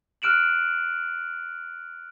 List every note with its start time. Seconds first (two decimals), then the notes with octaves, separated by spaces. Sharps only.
0.22 F6 F#6 D7 E7 F#7